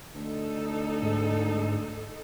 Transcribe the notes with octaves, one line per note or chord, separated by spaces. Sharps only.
D2 D#4 A4
G#2